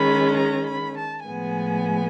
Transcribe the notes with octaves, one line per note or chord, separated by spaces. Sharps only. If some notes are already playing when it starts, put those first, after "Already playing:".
Already playing: D#3 G#3 C#4 B5
A#5
B5
A5
A2 F3 G#3 B3 G#5